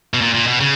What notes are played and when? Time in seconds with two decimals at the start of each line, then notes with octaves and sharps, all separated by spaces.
0.14 B2
0.21 A#2
0.34 A#2
0.47 B2
0.60 C#3